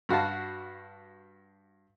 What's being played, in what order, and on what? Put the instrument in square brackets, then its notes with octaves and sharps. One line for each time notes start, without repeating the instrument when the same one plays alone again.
[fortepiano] G2 F#4 F5 A5